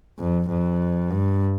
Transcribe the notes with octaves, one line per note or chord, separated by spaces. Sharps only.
F2
F2
G2